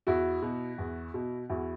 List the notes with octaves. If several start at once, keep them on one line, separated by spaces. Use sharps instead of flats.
E2 E4 F#4
B2
E2
B2
E2 E4 F#4